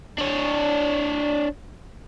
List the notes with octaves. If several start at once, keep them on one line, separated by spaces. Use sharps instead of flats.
D4 C#5